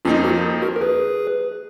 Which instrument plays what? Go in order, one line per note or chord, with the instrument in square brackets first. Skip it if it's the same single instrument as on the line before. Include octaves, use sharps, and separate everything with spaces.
[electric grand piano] F2 F3 A#3 D#4 [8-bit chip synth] C#4 F4
[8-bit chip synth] F#4 A#4
F#4 A#4
A#4
G#4 B4